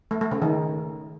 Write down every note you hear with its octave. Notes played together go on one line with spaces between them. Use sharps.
A3
A3
C#3
D#3